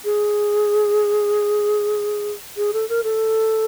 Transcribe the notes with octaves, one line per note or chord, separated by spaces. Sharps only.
G#4
G#4
A4
A#4
A4